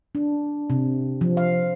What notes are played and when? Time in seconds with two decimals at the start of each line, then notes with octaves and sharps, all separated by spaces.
0.15 D4
0.70 C3
1.21 F3
1.37 F5